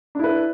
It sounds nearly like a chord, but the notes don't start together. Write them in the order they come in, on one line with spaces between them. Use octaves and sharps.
D4 E4 B4